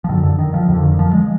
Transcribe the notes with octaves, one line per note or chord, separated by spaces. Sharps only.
F3
F#2 D3 D#3
D3
D#3
F3
F2 D#3
D3
D#3
F3
G#3